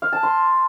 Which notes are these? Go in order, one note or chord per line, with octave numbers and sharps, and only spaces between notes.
F5
A5
C6